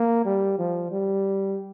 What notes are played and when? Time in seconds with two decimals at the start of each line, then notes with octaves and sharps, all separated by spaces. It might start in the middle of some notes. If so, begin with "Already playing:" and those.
Already playing: A#3
0.25 G3
0.59 F3
0.91 G3